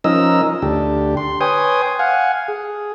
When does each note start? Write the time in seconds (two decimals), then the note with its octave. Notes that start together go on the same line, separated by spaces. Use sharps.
0.04 F3 C#4 D#4 A#4 D#5 E6
0.62 D2 D4 G4
1.17 C6
1.41 B4 C#5 G5 G#5 C6 D#6
1.99 F5 F#5 G#5
2.48 G#4